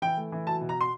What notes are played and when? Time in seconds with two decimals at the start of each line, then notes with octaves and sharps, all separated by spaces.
0.02 E3 G5
0.17 A3
0.32 E3
0.47 F#3 A5
0.61 B2
0.69 A#5
0.81 C6